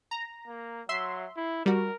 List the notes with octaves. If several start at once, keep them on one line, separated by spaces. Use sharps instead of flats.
A#5
A#3
F#3 E5 C6
E4
G3 F#4 A#4